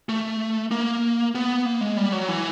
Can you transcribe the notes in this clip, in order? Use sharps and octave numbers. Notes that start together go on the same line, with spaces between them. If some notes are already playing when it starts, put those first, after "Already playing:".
A3
A#3
B3
A#3
G#3
G3
F#3
E3